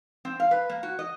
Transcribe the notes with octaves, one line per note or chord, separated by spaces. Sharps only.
C4
F5
B4
A#3
F#4
D#5